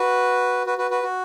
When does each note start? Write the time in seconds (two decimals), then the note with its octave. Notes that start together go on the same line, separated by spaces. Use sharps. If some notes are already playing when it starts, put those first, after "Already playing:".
Already playing: F#4 B4
0.66 F#4 B4
0.78 F#4 B4
0.91 F#4 B4
1.03 F#4